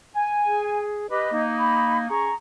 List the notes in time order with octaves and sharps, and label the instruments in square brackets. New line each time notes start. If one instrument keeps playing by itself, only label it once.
[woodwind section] G#5
[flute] G#4
[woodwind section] G4 B4 [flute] D#5
[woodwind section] A#3 D#4
[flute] B5
[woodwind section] C#4 G#4 C#6 [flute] A#5